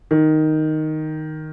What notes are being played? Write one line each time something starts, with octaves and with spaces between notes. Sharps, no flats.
D#3